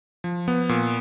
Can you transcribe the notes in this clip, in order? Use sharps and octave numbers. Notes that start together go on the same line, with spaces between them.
F3
B3
A#2